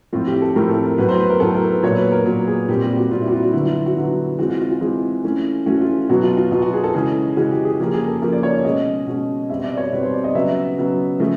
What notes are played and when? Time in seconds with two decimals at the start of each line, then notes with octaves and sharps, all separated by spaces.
0.13 A2 F3 A3 C4 F4
0.27 G4
0.42 A4
0.55 A2 F3 A3 C4 A#4
0.69 A4
0.84 A#4
0.98 A2 F#3 B3 B4
1.09 C5
1.19 B4
1.30 A#4
1.40 A2 F#3 B3 A4
1.55 A#4
1.69 B4
1.83 A#2 F#3 B3 C#5
1.97 B4
2.12 A#4
2.25 A#2 F#3 B3
2.47 G#4
2.69 A#2 G3 C4 G4
2.83 G4
2.97 F#4
3.10 A#2 G3 C4 F4
3.22 E4
3.28 F#4
3.32 F4
3.43 F#4
3.53 D3 F#3 B3 E4
3.64 F4
3.75 F#4
3.86 F#4
3.96 D3 F#3 B3
4.38 E3 G#3 C4 F#4
4.49 F4
4.60 F4
4.71 F4
4.81 E3 G#3 C4
5.24 E3 A3 C#4
5.66 E3 A3 C#4 F#4
5.81 F4
6.09 B2 F#3 B3 F#4
6.23 F4
6.37 F4
6.51 B2 F#3 B3 F4
6.62 F#4
6.73 G#4
6.84 A4
6.94 C#3 E3 G#3 C#4 G#4
7.37 C#3 E3 G#3 C#4 F#4
7.51 G4
7.65 G#4
7.80 C#3 F3 A#3 C#4 G4
7.94 G#4
8.07 A4
8.22 C#3 F3 A#3 C#4 A#4
8.32 D5
8.43 C#5
8.54 D5
8.64 B2 G#3 C#4 D#5
9.07 B2 G#3 C#4
9.49 B2 G3 C4 E5
9.64 D5
9.77 C#5
9.92 B2 G3 C4 B4
10.03 C5
10.14 D5
10.24 D#5
10.35 C#3 F#3 B3 E5
10.77 C#3 F#3 B3
11.20 C#3 F3 A3